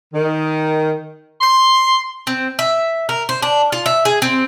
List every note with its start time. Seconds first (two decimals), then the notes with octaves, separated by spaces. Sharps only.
0.14 D#3
1.41 C6
2.27 C4
2.59 E5
3.09 A#4
3.29 C5
3.42 D4
3.72 F4
3.86 E5
4.05 G#4
4.22 C4